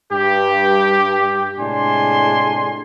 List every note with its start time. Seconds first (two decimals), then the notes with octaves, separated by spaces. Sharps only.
0.11 G2 G4
1.59 A2 C3 G#3 D4 G#5 C6